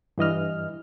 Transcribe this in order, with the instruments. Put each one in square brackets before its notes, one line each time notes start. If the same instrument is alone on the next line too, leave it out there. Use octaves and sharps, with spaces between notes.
[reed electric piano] G2 E3 D#5 F6